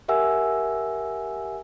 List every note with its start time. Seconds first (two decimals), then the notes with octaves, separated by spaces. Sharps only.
0.08 G4 A#4 E5 F#5 G#5 E6